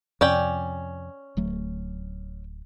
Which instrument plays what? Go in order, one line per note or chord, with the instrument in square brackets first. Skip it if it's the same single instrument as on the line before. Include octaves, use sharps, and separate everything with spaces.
[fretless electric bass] F2 C3 [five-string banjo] C#4 D5 G5
[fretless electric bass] D1 F#3 A3